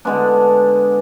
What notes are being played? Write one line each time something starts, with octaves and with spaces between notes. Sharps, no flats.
D3 G#3 B3 D4